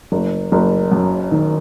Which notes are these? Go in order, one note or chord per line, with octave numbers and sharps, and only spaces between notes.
F#1
F#1
F#2
D#3